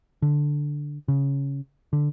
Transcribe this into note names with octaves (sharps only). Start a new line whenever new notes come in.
D3
C#3
D3